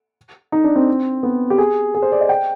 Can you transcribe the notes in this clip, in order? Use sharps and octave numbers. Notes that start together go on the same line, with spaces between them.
D#4
D4
C4
B3
G4
G#4
G#4
C5
D5
D#5
G5